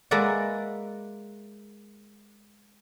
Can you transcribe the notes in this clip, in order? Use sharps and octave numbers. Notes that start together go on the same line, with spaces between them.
G#3 A#3 B4 D5 E5 F#5